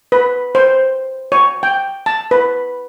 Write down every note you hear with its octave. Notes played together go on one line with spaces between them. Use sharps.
B4
C5
C#5
G5
A5
B4